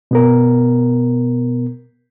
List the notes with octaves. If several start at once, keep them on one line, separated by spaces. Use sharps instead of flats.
B2 B3 A#4